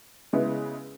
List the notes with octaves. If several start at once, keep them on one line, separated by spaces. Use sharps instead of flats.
C#3 G#3 B3 E4